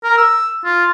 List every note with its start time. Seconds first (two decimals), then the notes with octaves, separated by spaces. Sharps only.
0.04 A#4
0.18 E6
0.65 F4